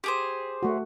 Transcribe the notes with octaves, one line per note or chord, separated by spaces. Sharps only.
G4 G#4 C5
A3 F#4